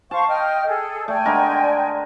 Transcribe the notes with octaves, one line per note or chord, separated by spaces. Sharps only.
C5 F5 A5 C#6
D#5 G5 F6
G#4 A4
A3 D5 G5 G#5
D3 G#3 A#4